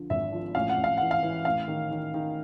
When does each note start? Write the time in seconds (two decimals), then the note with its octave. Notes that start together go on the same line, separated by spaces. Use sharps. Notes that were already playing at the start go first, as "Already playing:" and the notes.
Already playing: D3 F3
0.10 G#1 E5
0.32 F3
0.55 A1 F5
0.69 F#5
0.78 A1
0.84 F5
0.97 E3 F#5
1.11 F5
1.23 E3
1.45 A1 F5
1.68 D#3
1.91 D#3
2.14 D#3